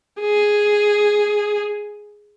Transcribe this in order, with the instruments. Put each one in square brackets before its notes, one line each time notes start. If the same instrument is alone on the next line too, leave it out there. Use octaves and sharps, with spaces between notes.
[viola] G#4